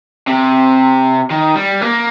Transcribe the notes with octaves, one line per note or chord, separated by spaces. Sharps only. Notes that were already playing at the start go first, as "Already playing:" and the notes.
C3
D#3
G3
A#3